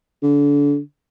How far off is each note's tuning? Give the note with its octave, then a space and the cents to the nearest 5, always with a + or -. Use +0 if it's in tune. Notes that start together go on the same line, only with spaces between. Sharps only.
D3 -30